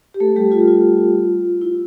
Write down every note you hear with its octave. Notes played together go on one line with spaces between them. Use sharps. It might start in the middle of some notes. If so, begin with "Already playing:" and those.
G4
A3 A4
G3 G4
F4
F4
E4